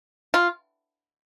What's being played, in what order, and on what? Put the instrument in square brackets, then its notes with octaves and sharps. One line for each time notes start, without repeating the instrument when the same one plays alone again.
[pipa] F4